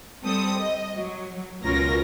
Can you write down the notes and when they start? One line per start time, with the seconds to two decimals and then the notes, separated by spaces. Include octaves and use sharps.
0.23 G3 C4 A4 D#6
0.59 D#5
0.96 F#3
1.63 C#2 B2 C#4 F4 A#4 A#6